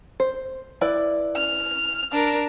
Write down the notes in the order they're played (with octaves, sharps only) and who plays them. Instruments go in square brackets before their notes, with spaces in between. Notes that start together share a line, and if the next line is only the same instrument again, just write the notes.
[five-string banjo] C5
E4 B4 D5
[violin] F6
D4 A#4